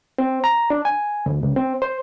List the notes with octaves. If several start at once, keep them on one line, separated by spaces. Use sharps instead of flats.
C4
A#5
D4
G#5
D2
C#2
C4
C5